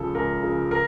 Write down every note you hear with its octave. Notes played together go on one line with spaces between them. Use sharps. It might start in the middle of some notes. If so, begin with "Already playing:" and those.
Already playing: C#2 C#3 F3 A4
C#2 A#4
C#3 F3
A#4